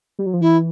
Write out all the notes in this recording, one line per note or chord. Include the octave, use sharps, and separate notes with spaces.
G3
F#3
F3
E3 E4